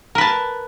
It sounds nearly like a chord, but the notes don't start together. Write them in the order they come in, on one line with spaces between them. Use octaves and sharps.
A#4 B4 A5